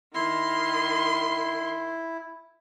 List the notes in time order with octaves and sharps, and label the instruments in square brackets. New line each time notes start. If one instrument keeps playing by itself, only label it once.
[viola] D#3 C6 [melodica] E4